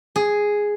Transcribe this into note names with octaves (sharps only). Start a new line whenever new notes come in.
G#4